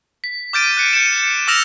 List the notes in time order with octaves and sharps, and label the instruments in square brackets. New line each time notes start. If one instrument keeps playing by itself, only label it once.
[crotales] B6
D6 F6 G6 A6 D7 D#7
F#6 C#7
G6 C#7 D#7 E7
C#7
D6 E6 F6 A#6 E7 F7